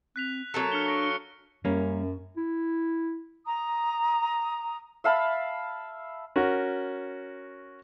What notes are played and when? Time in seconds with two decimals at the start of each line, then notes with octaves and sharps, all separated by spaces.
0.16 C4 F#6 B6 F7
0.54 F#3 A#3 C4 A4
0.72 D4 F6 C#7 G7
0.86 C#6 A#6 D7
1.03 C#7 G7
1.65 F#2 G3 A#3 C#4
2.37 E4
3.44 A#5 D#6
5.04 E5 F5 A5 B5
6.36 C#4 F#4 A#4